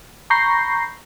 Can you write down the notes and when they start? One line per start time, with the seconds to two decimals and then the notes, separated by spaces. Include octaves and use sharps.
0.30 A#5 B5 C#6 G6 A#6 C7